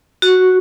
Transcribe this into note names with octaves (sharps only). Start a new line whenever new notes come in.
F#4